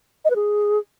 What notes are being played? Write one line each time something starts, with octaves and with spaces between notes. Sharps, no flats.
D#5
B4
G#4